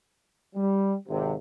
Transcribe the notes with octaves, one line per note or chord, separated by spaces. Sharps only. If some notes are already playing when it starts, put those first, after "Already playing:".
G3
G#1 C3